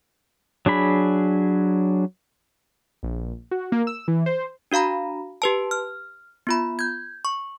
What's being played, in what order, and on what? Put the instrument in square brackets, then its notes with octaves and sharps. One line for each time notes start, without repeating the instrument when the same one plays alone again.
[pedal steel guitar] F#3 D4 G#4 B5
[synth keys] A#1
F#4
A#3
E6
E3
C5
[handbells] D4 F#4 F5 A#5 B5
G4 B4 A5
F6
B3 F4 B5
G6 G#6
C#6